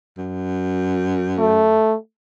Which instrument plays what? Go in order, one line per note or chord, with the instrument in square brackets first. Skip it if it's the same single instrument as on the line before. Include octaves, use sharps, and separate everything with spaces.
[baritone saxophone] F#2
[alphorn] A3